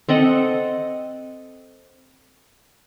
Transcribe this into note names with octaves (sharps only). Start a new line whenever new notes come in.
C4 A4 D#5 F#5